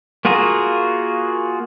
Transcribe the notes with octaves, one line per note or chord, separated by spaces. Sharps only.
A#3 F4 F#4 G#4 A#4